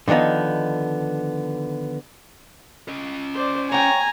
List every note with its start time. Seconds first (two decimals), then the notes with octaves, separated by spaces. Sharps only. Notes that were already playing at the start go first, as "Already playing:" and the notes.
0.08 D3 D#3 F3 B3 D#4
2.88 C#4 D#5
3.34 C5 D5
3.72 C#5 G5 G#5 A#5